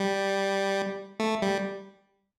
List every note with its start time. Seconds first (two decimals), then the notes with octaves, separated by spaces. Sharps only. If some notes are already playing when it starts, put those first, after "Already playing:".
Already playing: G3
1.20 A3
1.42 G3